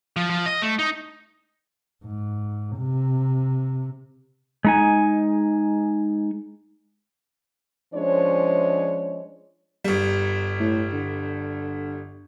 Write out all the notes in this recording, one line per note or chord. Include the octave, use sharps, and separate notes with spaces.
F3
F3
D#5
A3
D#4
G#2
C3
G#3 D#4 G#5
F3 G#3 C#4 D4 C5 C#5
G1 G3
A2
D3